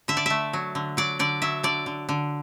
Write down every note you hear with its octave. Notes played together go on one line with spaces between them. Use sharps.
D3 E5
D5
A3 E5
F#3
D3
F#3 D5
D3 D5
F#3 E5
D3 D5
D3
D3